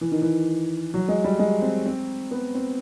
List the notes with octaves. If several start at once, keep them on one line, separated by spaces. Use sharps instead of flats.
E3
D#3
E3
F#3
G#3
G3
G#3
C4
C4
B3
C4